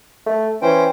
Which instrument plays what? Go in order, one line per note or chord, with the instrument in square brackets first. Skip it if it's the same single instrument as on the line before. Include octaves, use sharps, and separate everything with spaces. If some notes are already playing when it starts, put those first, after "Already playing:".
[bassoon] A3
[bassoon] E3 [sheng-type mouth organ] C#4 C5 G5